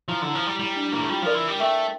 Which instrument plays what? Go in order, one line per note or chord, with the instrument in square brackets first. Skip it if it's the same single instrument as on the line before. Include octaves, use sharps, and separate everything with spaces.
[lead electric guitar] F3 [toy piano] E4
[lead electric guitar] D3 [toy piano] E4
[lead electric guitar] F3
[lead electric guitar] G3 [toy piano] E4
[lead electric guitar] G3 [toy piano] E4
[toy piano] D4
[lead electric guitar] A#3 [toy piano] E4
[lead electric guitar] A3
[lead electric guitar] G3 [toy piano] F4
[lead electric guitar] F3 [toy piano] A#4 D5
[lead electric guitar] E3
G3
[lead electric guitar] A3 [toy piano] E5 G5